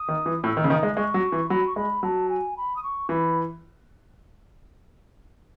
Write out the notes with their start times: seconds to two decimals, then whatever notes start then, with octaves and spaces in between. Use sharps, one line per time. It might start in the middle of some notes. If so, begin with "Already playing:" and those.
Already playing: D#6
0.08 D#3
0.26 E3
0.44 A2 E6
0.57 D#3
0.64 C#3
0.70 D#3 D#6
0.83 G#3
0.96 G#3 C#6
1.14 F#3
1.32 E3
1.49 F#3 B5
1.67 C#6
1.76 G#3 B5
2.03 F#3 A5
2.29 G#5
2.57 B5
2.76 D#6
2.83 C#6
3.09 E3 B5